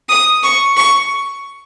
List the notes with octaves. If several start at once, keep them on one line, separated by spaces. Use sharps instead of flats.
D#6
C#6
C#6